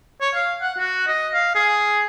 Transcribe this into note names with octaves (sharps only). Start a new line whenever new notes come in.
C#5
F5
F#5
F#4
D#5
F5
G#4